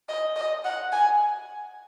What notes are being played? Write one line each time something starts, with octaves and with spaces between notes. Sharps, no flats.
D#5
D#5
F#5
G#5